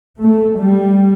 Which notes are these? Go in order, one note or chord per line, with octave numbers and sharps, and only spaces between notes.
A3
G3